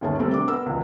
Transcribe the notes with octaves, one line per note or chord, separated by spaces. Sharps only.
G1 D#2 C#4 G#4 A5
C3 G3 A3 C4 A4 A#4
C3 D4 D6
B3 A#4 E6
E1 C#2